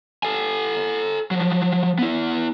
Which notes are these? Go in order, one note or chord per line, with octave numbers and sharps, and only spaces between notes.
A4 G#5
F3 F#3
B3 E4